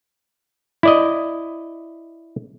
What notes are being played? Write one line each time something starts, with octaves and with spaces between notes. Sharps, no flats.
E4 D5 D#5